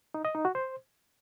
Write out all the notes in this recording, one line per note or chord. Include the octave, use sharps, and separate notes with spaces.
D#4
D#5
D#4
F#4
C5